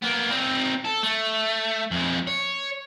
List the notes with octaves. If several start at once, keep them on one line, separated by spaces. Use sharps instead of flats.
A#3 B3
C4 D#4
A4
A3
F2 G#3
C#5